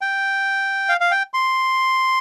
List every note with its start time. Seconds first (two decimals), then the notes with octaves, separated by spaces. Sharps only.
0.01 G5
0.89 F5
1.01 F5
1.11 G5
1.34 C6